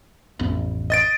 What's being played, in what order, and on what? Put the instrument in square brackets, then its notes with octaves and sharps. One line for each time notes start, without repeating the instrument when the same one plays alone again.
[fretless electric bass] A1 F2 B3
[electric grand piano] D#5 A6 D7